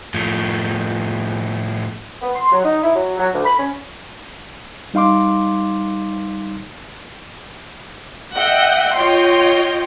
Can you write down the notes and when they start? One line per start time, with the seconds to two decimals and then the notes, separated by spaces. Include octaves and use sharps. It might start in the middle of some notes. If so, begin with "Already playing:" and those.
0.14 A2 F3
2.22 B3
2.34 C6
2.52 F#3
2.64 D#4
2.83 E4
2.94 F#3
3.17 F#3
3.34 D2
3.45 B5
3.59 C#4
4.94 G3 D#4 F5 C6 D6
8.35 D#5 E5 F#5 G5
8.97 F4 C#5 D#5 G5 C6